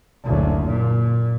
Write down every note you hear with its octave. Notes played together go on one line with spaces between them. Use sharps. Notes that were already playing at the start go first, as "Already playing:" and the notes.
F#1 D2
A#2